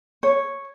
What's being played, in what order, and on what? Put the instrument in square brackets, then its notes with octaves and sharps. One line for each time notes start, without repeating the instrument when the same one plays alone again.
[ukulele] C#5